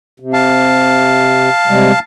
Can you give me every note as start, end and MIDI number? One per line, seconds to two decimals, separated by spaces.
0.20 1.49 48
0.33 1.99 77
0.33 1.99 81
1.67 1.92 48
1.67 1.92 55
1.67 1.92 56